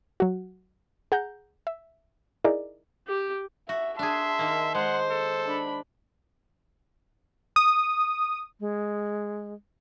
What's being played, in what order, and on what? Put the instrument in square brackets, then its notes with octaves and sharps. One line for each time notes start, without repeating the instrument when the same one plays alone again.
[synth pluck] F#3 F#4
G#4 F#5 A#5 G6
E5
D#4 E4 G#4 A#4 D5
[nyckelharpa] G4
[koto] F#4 [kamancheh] E5
[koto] D4 G#4 [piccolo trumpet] E5 [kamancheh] A5 C6
[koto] D#3 A#3
[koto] G#3 [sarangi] C5 [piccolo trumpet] F#5
[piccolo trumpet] A4
[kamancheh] D4 B5
[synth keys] D#6
[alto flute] G#3